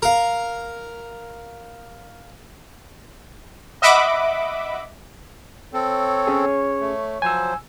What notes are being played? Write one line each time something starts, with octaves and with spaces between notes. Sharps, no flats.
A#4 F5
D#5 E5 F#5 B5 D6
C4 A4 C#5
C#4 G#4
A3
F3 F#3 C5 G#5 E6